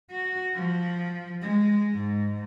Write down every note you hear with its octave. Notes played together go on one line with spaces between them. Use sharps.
F#4
F3
G#3
G#2